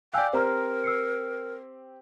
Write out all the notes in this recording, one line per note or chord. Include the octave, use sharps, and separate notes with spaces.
D5 F5 G5 G#5 E6 F#6
C4 G4 A#4 C5 A#5 F6
E6 C7 C#7